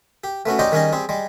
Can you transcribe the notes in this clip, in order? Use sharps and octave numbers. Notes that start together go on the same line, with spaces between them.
G4
A3 B3 C#4 F#4
C#4 D#4 G4 C5 D5 D#5
D#3 G3 C#4 D#4 G#4 D#5
G3 C4 G#4
G3 G#3